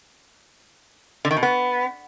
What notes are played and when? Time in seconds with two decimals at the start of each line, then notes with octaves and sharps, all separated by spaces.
1.25 D3
1.31 D#3
1.37 B2
1.43 B3